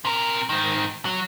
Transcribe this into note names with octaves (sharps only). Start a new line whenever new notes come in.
C3 A#4
G#2 D#3
F#3